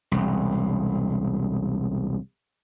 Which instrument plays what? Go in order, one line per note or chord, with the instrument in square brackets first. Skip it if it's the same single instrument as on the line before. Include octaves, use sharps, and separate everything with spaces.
[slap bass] E1 C2